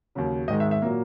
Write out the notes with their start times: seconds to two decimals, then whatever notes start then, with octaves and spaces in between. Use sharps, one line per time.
0.15 D#2 C#3 F#3
0.48 G#2 D#3 G#3 D#5
0.60 E5
0.71 E5
0.82 A#2 F#3 A#3